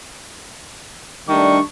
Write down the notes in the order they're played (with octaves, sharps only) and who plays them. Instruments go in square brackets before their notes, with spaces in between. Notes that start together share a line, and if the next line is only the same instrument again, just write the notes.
[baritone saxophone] D#3 [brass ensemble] G3 A3 D4 [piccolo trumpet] C#6